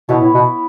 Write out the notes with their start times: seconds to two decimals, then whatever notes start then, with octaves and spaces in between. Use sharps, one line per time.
0.09 B2 B3 E4 C#5 E5
0.21 A2
0.34 B2